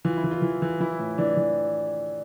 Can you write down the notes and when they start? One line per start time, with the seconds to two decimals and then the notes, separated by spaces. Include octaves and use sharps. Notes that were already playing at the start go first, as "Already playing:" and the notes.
0.05 E3 F4
0.17 E4
0.24 E3
0.31 F4
0.42 E3
0.62 E3
0.80 E3 E4
1.00 A2
1.18 E3 D4
1.37 E3